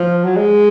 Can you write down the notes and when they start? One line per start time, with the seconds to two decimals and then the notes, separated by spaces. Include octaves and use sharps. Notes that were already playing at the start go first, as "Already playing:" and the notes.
Already playing: F3
0.25 F#3
0.37 G#3